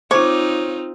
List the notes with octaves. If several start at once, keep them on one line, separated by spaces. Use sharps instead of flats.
C4 D#4 F4 C5 C#5 D6